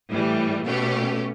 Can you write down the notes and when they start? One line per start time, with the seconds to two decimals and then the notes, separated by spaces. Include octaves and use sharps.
0.09 A2 E3 G3
0.64 B2 A3 C#4 G4